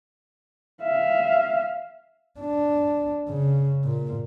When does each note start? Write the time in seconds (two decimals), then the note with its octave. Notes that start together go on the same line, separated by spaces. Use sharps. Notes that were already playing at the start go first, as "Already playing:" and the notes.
0.82 E5 F5
2.40 D4
3.29 C#3
3.84 A#2